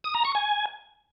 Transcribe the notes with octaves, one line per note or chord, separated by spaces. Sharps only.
D#6
A#5
C#6
G#5